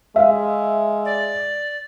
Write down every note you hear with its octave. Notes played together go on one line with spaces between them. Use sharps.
G#3 E5 F5
D5